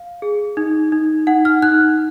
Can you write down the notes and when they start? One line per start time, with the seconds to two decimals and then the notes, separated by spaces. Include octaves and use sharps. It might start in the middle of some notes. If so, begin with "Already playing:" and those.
Already playing: F5
0.22 G#4
0.57 D#4
0.92 D#4
1.27 D#4 F#5
1.45 F6
1.62 D#4 F#6